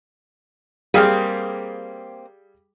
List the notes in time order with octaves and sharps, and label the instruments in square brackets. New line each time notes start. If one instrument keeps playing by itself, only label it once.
[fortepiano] G3 G#4 F5 [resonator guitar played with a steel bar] A#3 C4